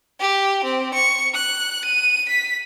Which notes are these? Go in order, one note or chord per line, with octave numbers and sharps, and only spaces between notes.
G4
C4
C#6
F#6
D#7
B6